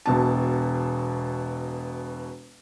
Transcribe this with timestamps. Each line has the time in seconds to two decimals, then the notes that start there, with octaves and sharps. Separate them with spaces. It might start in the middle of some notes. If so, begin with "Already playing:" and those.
0.06 E1 B2 A5